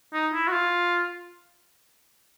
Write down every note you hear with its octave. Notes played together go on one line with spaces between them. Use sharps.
D#4
E4
F#4
F4